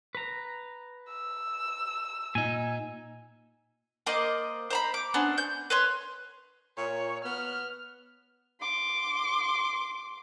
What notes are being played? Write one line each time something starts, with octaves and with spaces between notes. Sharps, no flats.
B4 A#5
E6
A#2 D#4 G#5
A#3 C5 D5 D#5
C5 A#5 B5
D6
B3 C#4 D4 C5
G6
B4 C#5 C6
A#2 C#5
B3 F6
C6 D6